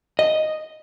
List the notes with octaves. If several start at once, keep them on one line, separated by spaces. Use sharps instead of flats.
D#5